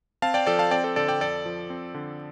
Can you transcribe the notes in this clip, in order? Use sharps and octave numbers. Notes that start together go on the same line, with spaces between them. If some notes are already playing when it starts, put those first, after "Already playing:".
C4 F5 A5
D5 G5
F3 A4 D5
F5 A5
C4 D5 G5
A4 D5
D3 A4 D5
D5 G5
F2 A4 D5
F3
C4
D3